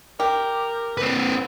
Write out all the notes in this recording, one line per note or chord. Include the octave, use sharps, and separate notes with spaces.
G4 A#4
C4 B4